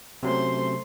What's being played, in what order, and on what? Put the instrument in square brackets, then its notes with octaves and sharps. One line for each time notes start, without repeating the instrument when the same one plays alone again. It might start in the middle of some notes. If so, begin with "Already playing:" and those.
[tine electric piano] C3 F#3 C#4 [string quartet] A3 C5 C6